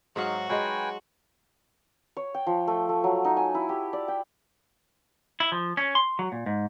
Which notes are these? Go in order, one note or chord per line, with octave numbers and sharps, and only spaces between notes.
G#2 F#3 D#4 F#4 F5
F#3 G#3 B4 G5 G#5
C#5
G5
F3
A3
A3
F#3
D#4
G#5
E4
G4
D5
G5
E4
F3
C#4
C6
F#3
A#2
G#2